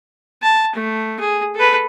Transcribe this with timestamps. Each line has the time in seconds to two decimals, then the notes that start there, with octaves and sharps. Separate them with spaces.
0.43 A5
0.75 A3
1.20 G#4
1.55 A4 B4